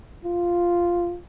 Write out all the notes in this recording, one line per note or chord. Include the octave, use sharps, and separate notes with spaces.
F4